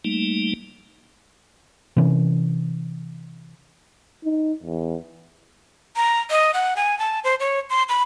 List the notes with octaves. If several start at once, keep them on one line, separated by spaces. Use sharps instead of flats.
G3 A3 A#3 D#4
C3 E3 C#4
D#4
E2
A#5
D#5
F#5
G#5
A5
C5
C#5
C6
B5